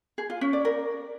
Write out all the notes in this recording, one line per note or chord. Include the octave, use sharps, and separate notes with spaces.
G#4
F4
C#4
D5
A#4